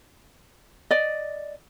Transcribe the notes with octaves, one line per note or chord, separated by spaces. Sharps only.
D5 D#5